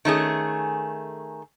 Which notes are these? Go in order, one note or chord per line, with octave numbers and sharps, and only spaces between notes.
D#3 A3 C#4 G#4